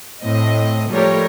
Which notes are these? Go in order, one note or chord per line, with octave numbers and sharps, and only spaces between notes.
A2 C4 D#5
F3 G3 A3 A#4 C#5